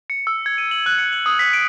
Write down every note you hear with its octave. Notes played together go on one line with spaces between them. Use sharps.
C#7
E6
G#6
D#7
F#7
F#6
C#7
F#7
D#6
B6
D7